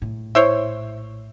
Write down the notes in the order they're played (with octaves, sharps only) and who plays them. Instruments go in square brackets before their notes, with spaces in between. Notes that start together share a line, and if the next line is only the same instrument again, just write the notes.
[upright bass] A#1 A2
[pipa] E4 C5 C#5